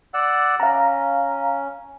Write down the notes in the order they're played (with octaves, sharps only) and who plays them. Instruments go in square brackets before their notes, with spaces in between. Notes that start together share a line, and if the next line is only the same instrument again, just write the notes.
[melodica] D5 F#5 E6
[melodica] C#4 [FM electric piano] F5 A#5